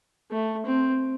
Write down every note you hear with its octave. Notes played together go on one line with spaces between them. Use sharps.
A3
C4